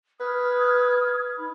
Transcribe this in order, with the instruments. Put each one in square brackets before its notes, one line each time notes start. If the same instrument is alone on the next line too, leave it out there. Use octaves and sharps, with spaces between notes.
[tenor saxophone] B4 [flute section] D#6 F6 G#6
[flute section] D#4 B5